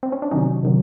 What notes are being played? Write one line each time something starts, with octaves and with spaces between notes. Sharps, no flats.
C4
C#4
D4
C3 D#3 F#3 C#4 D#4
C3 D#3 F#3